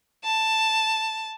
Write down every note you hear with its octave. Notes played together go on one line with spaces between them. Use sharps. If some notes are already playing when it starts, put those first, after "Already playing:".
A5